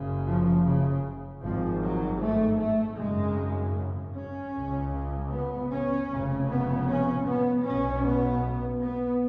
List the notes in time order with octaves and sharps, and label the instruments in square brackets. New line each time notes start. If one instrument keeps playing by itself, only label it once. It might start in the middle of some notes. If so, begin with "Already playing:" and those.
Already playing: [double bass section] F#1 F#2 C#3
F3
C#3
G#1 G#2 F3
F#3
A3
A3
G#1 F#2 C#3 G#3
C#4
C#2 C#3
B3
C#4
F1 F2 C#3
B3
C#4
B3
B1 B2 C#4
B3
B3